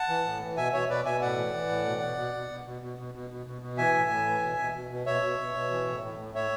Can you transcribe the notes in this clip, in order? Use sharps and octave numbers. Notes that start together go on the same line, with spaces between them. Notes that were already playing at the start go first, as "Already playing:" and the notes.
Already playing: F#5 A5
E3
A2
E3
B2 E5 G#5
B2 C#5 E5
B2 B4 D5
B2 E5 G#5
A2 D5 F#5
E3
E3
A2
B2
B2
B2
B2
B2
B2
B2
B2
B2
B2
B2
B2
E3 E5 G#5
A2
A2
E3
B2
B2
B2
B2
B2 C#5 E5
B2
B2
B2
E3
A2
A2
A2
A2 C#5 E5